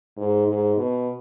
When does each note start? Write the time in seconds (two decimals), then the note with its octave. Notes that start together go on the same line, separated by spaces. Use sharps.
0.17 G#2
0.47 G#2
0.77 B2